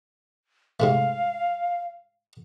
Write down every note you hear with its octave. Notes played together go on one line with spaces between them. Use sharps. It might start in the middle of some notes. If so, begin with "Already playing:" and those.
G#2 C3 A3 F5